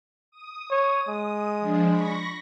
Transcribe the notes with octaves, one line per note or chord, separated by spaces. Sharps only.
D#6
C#5
G#3
F3 D4
B5 C#6 A#6